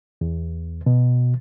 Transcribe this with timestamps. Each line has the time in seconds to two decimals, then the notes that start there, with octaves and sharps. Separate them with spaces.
0.21 E2
0.86 B2